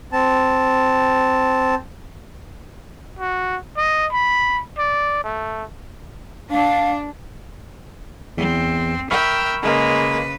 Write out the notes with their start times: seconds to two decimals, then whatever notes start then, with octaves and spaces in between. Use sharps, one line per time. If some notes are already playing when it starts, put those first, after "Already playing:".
0.12 C4 A5
3.19 F#4
3.77 D#5
4.12 B5
4.78 D5
5.24 A3
6.51 D4 F5
8.38 E2 C4
9.11 A#4 E5 G5 B5 C#6 F6
9.62 C#3 G#3 A#3 B4